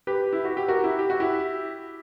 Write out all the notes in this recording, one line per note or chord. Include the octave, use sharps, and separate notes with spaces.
G4 B4
E4
F#4
G4
F#4 A#4
E4 G4
G4
F#4
E4 G4